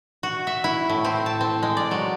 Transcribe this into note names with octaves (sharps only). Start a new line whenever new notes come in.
F#4
E5
E4
A2
C4
A5
C4
G#3
D5
F#3